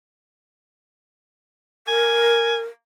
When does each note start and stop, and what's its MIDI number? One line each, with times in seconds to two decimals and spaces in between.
1.87 2.64 70
1.87 2.58 80